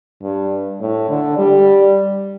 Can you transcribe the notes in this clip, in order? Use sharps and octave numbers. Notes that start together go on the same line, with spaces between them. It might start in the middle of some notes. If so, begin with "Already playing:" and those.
G2
A2
D3
G3